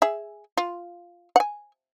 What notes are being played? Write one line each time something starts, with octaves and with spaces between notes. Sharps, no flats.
G#4 E5
F4
F#5 G#5